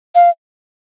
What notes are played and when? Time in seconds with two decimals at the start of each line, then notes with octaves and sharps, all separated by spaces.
0.15 F5